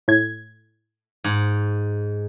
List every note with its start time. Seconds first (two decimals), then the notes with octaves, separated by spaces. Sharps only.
0.08 A2 G#6
1.24 G#2